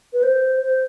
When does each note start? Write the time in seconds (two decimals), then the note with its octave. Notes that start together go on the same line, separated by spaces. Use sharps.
0.13 B4
0.23 C5
0.62 C5